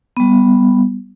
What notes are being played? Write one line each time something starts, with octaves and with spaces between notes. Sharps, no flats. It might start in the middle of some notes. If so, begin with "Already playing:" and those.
G3 B3